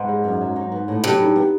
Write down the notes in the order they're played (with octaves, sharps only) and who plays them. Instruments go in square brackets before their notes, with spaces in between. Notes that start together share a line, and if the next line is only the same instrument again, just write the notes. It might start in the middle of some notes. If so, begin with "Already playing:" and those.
Already playing: [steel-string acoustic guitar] G#2 [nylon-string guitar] B3
[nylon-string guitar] G#3
F#2
F#3
D#4
B3
A2
[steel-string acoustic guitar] G2 [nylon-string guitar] F#3
[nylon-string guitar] D#4
B3